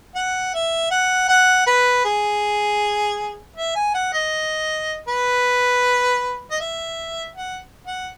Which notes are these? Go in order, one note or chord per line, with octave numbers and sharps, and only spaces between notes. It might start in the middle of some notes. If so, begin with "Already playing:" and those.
F#5
E5
F#5
F#5
B4
G#4
E5
G#5
F#5
D#5
B4
D#5
E5
F#5
F#5